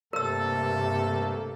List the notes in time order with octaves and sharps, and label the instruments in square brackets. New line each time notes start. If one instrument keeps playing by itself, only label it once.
[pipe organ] G2 A3 A#3 [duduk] C3 [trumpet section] A4 [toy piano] A#4 E6